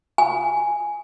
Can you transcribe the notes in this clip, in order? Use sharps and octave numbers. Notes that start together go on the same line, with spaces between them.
G#5